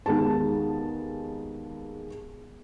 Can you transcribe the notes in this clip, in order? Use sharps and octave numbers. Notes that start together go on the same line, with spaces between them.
D#2 G#3 B3 A5